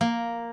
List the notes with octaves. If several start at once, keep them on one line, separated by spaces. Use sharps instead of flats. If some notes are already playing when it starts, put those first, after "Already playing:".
A#3